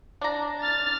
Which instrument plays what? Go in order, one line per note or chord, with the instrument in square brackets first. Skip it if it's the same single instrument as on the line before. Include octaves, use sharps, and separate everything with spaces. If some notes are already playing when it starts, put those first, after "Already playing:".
[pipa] D4 A#5
[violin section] F6 A6